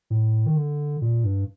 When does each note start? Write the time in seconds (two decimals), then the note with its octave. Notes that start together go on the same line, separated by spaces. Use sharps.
0.10 A2
0.46 D#3
0.56 D3
1.02 A#2
1.24 G2